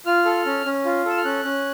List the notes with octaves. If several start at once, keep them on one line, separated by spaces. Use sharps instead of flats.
F4 F6
A4
C#4
C#4
F4
A4 E6
F6
C#4 F#6
C#4